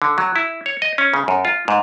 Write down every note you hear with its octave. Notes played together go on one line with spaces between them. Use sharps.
D3
F#3
E4
C#5
D#5
C#4
C#3
F#2
F4
G#2